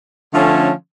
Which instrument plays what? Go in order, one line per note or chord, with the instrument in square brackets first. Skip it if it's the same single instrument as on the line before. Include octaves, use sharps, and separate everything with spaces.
[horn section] D3 F3 A3 C#4